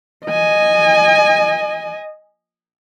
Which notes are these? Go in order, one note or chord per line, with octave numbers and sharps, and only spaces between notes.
D#5 G#5